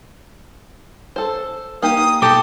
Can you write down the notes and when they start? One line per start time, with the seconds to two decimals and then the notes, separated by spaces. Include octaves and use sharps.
1.16 A4 C5
1.82 A#3 D#4 G4 D#6
2.22 B1 A4 G5 A5 D6